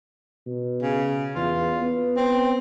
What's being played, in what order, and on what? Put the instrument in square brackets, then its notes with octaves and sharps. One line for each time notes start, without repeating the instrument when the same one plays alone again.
[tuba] B2
[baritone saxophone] C#3
[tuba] E2 [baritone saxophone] F4
[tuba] B3
[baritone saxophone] C4